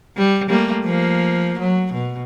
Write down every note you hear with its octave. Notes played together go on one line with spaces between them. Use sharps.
G3
G3 A3 A#3
F3 A#3
F#3
B2